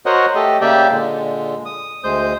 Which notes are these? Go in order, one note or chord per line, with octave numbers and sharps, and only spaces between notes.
F#4 A#4 C5 C#5 D#5 F#5
A3 G4 A4 D#5
C#3 A#3 G4 D5 E5 G5
A#2 D3 G#3
D#6
D2 G#3 C5 D#6 G6